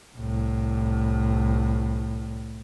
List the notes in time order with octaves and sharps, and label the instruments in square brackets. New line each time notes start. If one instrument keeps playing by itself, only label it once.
[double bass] C2 A2